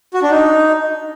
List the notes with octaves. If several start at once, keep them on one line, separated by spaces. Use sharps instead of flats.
F#4
D4
D#4